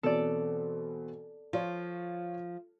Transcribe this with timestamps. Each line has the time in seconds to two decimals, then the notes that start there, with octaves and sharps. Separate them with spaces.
0.03 B2 E3 C4 A4 D5
1.53 F3 F4 C#5